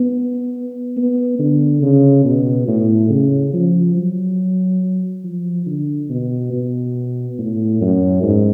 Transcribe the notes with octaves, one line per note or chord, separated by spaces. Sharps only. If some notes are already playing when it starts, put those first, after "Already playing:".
Already playing: B3
B3
D3
C#3
B2
A2
C#3
F3
F#3
F3
D3
B2
B2
A2
F#2
G#2